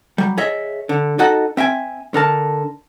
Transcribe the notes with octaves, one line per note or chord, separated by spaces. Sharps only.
F#3 G3
G#4 C#5 D#5 E5
D3
D#4 F#4 A4 D#5 F#5
C4 E5 G5 G#5
D3 A#4 A5